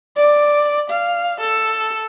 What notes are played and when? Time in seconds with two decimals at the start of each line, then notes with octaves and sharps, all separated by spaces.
0.16 D5
0.90 F5
1.41 A4